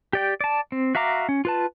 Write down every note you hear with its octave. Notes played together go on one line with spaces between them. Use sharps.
G4 D5 G5
D5 A5
C4
F#4 E5 F5 A#5 D6
C#4
F4 B4 A5